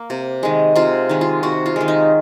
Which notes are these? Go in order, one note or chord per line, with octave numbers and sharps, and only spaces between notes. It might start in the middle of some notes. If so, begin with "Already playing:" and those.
Already playing: A#3
C3
D#3 G#3
C3 F4
D#3 G#3
F4
C3 F#4
F4
D#3 G#3
D#4